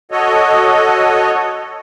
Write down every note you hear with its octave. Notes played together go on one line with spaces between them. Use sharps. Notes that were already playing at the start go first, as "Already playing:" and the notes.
F#4 A4 C#5 D#5